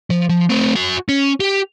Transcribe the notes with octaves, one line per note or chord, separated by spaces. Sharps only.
F3
F3
A3 C4
F#4 G#5
C#4
G4